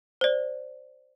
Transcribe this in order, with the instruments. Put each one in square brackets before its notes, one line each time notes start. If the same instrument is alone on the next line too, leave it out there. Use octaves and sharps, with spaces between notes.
[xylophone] C5 D5